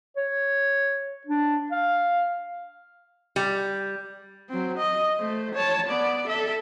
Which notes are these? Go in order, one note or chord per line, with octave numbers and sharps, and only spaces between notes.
C#5
D4
F5
G3
F#3 C4
D#5
A3 C5
C#5 A5
B3 D5
A4 E5